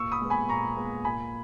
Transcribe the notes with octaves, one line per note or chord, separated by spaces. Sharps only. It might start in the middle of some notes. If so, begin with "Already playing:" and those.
Already playing: A#2 C#6 E6
B5 D#6
G#3 B3
G#5 B5
A#2 A#5 C#6
G#3 B3
A#2 G#5 B5